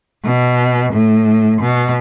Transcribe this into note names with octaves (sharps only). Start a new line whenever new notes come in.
B2
A2
B2